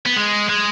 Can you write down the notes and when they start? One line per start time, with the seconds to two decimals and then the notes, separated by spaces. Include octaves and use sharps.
0.06 B3
0.16 G#3
0.49 G#3